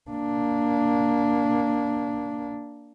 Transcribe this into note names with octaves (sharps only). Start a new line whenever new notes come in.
A#3 D4